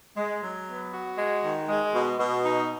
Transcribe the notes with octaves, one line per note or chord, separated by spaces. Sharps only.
G#3
F#3
B3
F#4
G#3
D#3
G#3
B2
B2
D#4